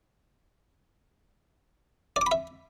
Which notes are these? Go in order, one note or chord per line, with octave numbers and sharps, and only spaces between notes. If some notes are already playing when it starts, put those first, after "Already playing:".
D5
D6
B5
E5